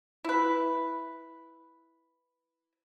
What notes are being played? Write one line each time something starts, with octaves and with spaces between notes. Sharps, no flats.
E4 B4